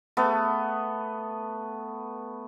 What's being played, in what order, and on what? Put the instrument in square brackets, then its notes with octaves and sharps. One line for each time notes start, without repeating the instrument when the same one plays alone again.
[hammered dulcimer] A3 B3